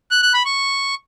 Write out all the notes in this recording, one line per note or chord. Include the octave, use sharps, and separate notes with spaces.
F#6
F#6
B5
C#6